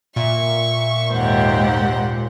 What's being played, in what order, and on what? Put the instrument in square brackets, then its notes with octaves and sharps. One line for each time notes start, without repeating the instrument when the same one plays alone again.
[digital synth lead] A#2 [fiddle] E5 C#6
[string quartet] D#2 G#2 G4 [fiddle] C5 F#5